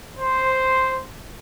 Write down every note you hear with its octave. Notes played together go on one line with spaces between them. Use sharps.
C5